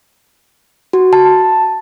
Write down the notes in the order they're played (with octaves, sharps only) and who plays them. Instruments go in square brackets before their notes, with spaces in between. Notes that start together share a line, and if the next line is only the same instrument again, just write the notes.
[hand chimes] F#4
A5